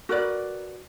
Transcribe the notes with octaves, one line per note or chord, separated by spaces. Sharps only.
F#4 A#4 B4 D5